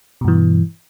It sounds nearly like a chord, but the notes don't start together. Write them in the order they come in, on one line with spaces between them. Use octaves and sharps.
B2 G2 E3